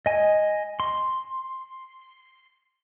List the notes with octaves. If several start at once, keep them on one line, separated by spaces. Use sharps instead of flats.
D#5 G#5
C6